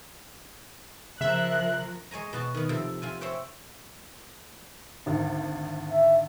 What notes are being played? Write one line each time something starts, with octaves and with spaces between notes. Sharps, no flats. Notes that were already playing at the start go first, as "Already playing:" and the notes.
C#3 F3 A#4 E5 F#6
G#3 C#5 G#5 A#5
B2 F#4 A5
D#3 B3
C3 F3 A4 G5
C3 F4 G#5
C4 C5 C#5 E5 G5
G#1 D2
E5